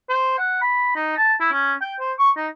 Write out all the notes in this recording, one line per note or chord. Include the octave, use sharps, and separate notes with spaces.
C5
F#5
B5
D#4
A5
E4
C#4
G5
C5
C#6
D#4